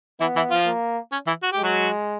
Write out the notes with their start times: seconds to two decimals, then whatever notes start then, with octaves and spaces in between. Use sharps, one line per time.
0.20 E3 B3 E4
0.36 E3 E4
0.51 F3 F4
0.66 A#3
1.12 C#4
1.27 E3 E4
1.43 F#4
1.52 G#3 G4
1.63 F#3 F#4